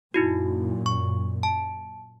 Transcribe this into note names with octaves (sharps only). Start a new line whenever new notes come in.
F#2 A#2 D#4 E4 F#4
C#6
A5